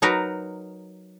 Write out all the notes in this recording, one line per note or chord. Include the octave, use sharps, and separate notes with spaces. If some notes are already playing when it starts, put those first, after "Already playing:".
F#3 D#4 F#4 A#4 B4